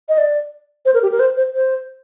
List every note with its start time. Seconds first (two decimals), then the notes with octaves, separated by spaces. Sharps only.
0.09 D#5
0.18 D5
0.85 C5
0.94 A#4
1.02 G4
1.11 A#4
1.19 C5
1.37 C5
1.54 C5